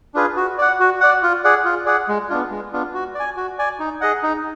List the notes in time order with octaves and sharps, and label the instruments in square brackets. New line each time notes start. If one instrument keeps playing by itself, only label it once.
[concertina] D4 F4 G#4 B4
F#4
D5 F#5
F#4
D5 F#5
F4
G#4 D5 F#5
F4
G#4 D5 F#5
G#3
B3 D4 F4
G#3
B3 D4 F4
F#4
D5
G#5
F#4
D5 G#5
D#4
G#4 D#5 F#5
D#4